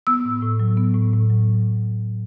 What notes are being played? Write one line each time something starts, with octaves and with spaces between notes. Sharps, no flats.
B3 E6
A2
A2
F#3
B3
A2
A2
F#3